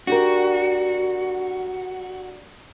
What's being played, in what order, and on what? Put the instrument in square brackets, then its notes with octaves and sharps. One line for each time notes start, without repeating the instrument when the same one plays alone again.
[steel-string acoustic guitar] D4 G4 A#4 [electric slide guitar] F#4